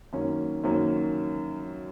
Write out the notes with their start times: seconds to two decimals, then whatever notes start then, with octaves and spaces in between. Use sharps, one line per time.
0.13 F#2 D#3 A#3 C#4
0.64 F#2 D#3 A#3 C#4